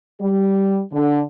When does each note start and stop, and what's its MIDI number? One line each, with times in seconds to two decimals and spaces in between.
0.20 0.80 55
0.93 1.22 50